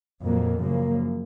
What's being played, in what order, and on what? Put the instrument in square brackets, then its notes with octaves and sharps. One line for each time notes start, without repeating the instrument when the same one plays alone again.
[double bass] F2 [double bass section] A#2 F#3 A#3
[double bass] F#2 [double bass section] C#3 F3 A#3